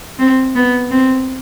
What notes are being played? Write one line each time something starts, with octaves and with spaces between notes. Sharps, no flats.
C4
B3
C4